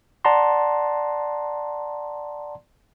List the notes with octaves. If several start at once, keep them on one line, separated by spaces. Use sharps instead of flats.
D5 F#5 A5 A#5 C6